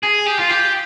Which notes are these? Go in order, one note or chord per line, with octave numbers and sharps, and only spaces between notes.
G#4
G4
F4
G4